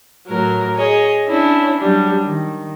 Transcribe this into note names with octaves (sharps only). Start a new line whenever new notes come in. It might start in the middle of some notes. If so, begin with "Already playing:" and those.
A2 F#3 A#4
G#4 C#5 D#5
C#4 D4 E4
F#3 G3 D4
D#3